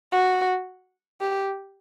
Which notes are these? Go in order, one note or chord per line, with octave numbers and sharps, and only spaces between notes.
F#4
G4